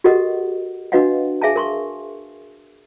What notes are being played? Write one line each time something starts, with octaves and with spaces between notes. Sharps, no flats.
F#4 G4 A4 A#4 D#5 F#5
D4 F#4 B4 D#5 F5 F#5
G#4 E5 F5 G#5 A5
A#4 C6 C#6